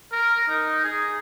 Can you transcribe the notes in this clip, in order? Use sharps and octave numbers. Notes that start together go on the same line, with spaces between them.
A#4
D#4
G#4